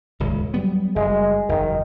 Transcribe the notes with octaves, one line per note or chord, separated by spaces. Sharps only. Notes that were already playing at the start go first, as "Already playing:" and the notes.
D#1 C#2 G#2
F#3 G3 B3
F#1 G3 G#3
F#1 E2 D#3